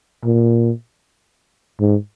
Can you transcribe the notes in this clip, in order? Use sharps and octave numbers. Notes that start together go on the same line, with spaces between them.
A#2
G#2